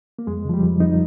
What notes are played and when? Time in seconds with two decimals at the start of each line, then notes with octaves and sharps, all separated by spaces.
0.19 A#3
0.27 F2 G#3
0.45 C#3 F3
0.54 G3
0.63 F2
0.80 F2 D#4